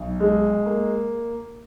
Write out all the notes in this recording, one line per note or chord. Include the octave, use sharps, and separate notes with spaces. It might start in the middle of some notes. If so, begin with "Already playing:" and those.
Already playing: B1
G#3
A#3